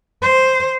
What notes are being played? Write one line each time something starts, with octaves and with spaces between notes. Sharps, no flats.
C5